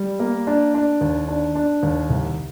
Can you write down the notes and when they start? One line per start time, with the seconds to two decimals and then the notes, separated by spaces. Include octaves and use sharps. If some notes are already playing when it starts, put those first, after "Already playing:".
Already playing: G3
0.20 A#3
0.47 D4
0.74 D4
1.01 D#2
1.28 D4
1.55 D4
1.83 D#2
2.10 C2